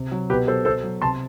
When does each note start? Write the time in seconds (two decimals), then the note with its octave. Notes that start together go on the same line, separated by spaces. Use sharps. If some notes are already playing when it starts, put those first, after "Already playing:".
Already playing: C3
0.11 F#3
0.30 B2 G4 B4
0.48 F#3 A4 C5
0.65 B2 A4 C5
0.83 F#3
1.02 C3 A5 C6